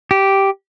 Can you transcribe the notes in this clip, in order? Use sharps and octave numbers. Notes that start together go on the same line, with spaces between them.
G4